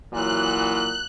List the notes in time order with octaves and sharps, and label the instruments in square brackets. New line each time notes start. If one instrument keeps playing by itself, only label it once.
[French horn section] A#2 E3 F#3 [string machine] F#6